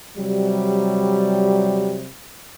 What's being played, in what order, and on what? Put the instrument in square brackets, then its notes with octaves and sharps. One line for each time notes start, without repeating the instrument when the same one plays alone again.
[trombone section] C3 F#3 G3